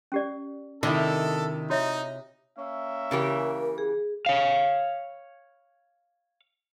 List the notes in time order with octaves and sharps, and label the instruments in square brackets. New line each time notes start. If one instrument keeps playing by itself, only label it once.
[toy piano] C#4 G4 D5
[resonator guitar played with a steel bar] C3 E4 [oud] D#3 D4 [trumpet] A4
[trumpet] D#4 [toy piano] F#4 C#5 E5
[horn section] A#3 C#4 E5
[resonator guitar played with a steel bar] C#3 E3 G4 [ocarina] A#4
[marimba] G#4
[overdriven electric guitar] C#5 F5